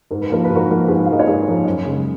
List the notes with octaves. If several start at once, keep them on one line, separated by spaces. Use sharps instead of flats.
G#2 A#4
B4
F3 A#3 A#4
B4
G#2
F#4 A#4
F3 A#3
G#2 G#4 B4
F5
F3 A#3 D#5
C#5
G#2 G#4 B4
F3 A#3
F#2
C#3 G#3